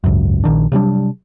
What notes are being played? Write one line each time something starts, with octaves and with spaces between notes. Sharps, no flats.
G#1 C#2 F#2
A#1 D#3 D4
C3 F#3 G3 D4